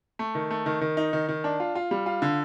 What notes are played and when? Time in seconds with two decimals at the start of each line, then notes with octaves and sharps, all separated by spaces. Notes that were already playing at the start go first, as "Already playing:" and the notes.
0.19 A3
0.35 D#3
0.51 A3
0.66 D#3
0.81 D#3
0.97 D#4
1.13 D#3
1.29 D#3
1.44 D4
1.60 F4
1.75 F4
1.91 G3
2.06 F4
2.22 D3